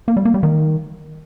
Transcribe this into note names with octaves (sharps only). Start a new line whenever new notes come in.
A#3
G3
A#3
G3
D#3